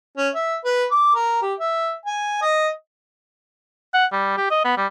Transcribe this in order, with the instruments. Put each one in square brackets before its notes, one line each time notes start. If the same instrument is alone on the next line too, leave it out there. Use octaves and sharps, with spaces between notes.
[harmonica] C#4
E5
B4
D6
A#4
G4
E5
G#5
D#5
[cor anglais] F#5
G3
G4
D#5
B3
G3